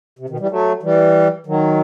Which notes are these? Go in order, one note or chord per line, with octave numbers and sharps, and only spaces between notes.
C3
B2 D#3
E3 G3
F#3 A3
E3 G3
D#3 F#3